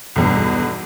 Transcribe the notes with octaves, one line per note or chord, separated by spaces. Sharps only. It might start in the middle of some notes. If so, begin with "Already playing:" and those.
B1 E2 G2